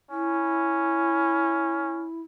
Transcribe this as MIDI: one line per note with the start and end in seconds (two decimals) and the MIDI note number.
0.10 2.06 61
0.10 2.21 64